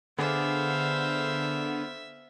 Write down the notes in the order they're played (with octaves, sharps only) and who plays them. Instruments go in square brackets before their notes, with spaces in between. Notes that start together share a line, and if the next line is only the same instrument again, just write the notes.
[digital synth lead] D3 [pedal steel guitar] B3 G#4 D5 [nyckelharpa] C5 F5 [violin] E5